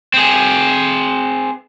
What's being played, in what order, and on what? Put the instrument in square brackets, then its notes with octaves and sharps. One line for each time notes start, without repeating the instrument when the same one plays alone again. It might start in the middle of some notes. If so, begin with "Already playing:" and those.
[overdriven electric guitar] C4 G#4